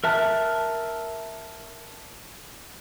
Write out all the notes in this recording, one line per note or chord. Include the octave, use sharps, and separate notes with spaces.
A#4 E5 A5 F#6